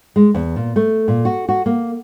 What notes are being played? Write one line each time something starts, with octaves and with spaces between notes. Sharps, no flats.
G#3
E2
A#2
A3
A#2
F#4
F#4
A#3